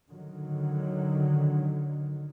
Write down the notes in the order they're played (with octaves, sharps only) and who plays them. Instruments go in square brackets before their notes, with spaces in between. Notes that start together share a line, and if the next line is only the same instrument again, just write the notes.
[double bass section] D3 D#3 F#3